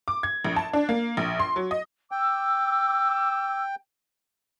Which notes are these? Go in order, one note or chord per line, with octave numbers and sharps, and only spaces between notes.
D6
G#6
A#1
A5
D4
A#3
A#1
C6
F#3
D#5
G5 D6 E6